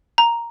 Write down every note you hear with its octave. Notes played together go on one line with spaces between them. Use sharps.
A#5